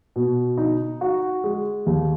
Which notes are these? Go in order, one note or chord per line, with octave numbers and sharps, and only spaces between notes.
B2
D#4
F#4
G#3
D#2